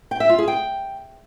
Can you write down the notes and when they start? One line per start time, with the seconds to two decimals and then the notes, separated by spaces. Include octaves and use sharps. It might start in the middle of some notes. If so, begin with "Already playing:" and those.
0.11 G5
0.20 E5
0.29 F4
0.38 G#4
0.48 G5